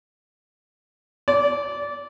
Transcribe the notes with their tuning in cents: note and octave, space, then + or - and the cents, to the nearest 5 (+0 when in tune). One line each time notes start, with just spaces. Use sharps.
D5 -20